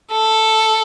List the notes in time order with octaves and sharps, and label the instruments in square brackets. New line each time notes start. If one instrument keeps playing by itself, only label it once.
[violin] A4